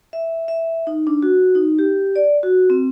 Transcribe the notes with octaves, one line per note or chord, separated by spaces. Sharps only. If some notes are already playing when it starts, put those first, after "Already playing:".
E5
E5
D#4
D4
F#4
D#4
G4
D5
F#4
C4